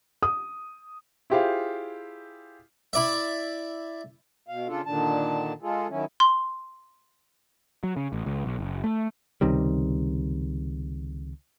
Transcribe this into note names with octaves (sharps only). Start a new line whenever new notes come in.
D#6
E4 F4 G4 G#4 C5 F5
E4 D5 E5
B2 F5
C#3 D4 F4 A4
A#2 D3 D#3 D4 A5
G#3 F4 G#4 A4
D#3 F#3 C#4 E4
C6
F#3
C#3
A1
C#2
B1
F#1
A3
C#2 C3 D#3 G3